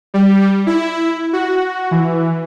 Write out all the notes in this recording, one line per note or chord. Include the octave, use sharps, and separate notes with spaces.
G3
E4
F#4
E3